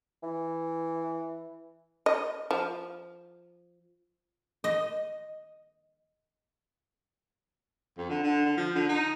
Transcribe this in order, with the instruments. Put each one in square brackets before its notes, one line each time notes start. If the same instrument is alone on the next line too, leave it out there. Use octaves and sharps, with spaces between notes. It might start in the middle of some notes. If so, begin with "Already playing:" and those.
[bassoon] E3
[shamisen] D#5
F3
[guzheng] D#5
[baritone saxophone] F2
D3
D3
D3
F3
D3
D#4